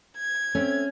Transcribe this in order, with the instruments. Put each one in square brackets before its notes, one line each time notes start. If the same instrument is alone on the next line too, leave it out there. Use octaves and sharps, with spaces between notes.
[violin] G#6
[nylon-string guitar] A3 C4 [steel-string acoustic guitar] C#4